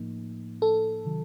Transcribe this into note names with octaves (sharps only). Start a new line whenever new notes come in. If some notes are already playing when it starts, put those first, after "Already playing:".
Already playing: A2 F3 A#3 D#4
A4
C3 D#3 F#3